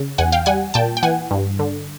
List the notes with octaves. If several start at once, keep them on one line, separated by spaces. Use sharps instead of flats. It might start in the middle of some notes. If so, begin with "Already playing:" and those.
Already playing: C#3
E2 F#5 G#5
F5 G5
G3 F#5 G#5
A#2 G5 A5
G5
E3 F#5 G#5
G2
D3